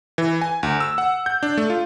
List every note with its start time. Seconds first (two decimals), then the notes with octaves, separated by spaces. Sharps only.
0.18 E3
0.41 G#5
0.63 D2
0.80 E6
0.98 F#5
1.26 G6
1.43 D4
1.57 A3
1.70 F4